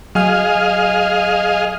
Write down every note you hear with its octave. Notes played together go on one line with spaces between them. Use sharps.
F#3 G#4 D#5 F5 G#5 F6